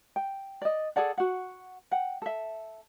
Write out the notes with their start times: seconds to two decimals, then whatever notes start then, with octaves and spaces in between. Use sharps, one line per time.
0.16 G5
0.62 D5 D#5
0.96 G#4 A4 D5 F#5
1.18 F#4 F#5
1.91 F#5 G5
2.22 A4 E5